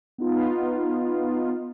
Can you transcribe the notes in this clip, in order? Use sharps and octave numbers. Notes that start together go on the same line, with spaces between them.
B3 D#4 F4